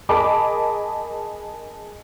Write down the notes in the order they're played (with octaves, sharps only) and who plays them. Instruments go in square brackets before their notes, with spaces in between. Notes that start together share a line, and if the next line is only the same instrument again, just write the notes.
[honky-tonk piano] G#4 A#4 D#5 A5 B5 D6